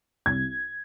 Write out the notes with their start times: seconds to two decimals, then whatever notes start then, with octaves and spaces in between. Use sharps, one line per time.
0.26 C2 G#6